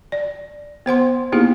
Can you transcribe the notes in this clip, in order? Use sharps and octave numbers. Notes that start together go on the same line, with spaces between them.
D5
B3 C5 F#5 C6
A#3 B3 D#4 E4 G4 G#4